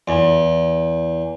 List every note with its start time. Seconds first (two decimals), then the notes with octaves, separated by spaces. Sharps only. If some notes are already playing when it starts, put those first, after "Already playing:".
0.08 E2